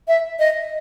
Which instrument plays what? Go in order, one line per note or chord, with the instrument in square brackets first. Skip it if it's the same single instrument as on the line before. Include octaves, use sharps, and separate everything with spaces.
[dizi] E5
D#5